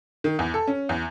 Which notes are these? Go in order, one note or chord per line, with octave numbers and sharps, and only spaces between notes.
D#3
E2
A4
C#4
E2